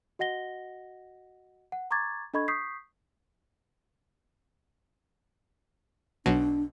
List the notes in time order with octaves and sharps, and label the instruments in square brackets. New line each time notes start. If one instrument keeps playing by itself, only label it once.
[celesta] F#4 D#5 F#5 A#6 G7
F#5
A#5 C#6 D6 G#6 A6
D4 A4 D#5 B5 C#6 G#6
C#6 D#6 G6 B6 C7
[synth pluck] B1 B2 F#3 [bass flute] D4